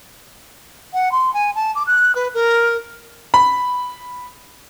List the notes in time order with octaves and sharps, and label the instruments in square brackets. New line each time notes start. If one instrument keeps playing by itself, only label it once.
[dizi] F#5
C6
G#5
A5
D6
F#6
B4
A#4
[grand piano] B5